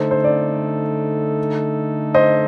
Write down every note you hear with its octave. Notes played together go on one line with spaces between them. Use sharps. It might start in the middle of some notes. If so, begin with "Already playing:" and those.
Already playing: D3 A3 D#4 A4 C5
C5
D5
C5 D#5